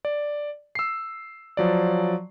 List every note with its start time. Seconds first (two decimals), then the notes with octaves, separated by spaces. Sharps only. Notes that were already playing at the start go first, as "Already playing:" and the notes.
0.05 D5
0.75 E6 C7
1.57 F3 F#3 D5